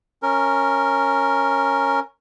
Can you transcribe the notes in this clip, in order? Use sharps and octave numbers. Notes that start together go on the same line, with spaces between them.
C#4 A#4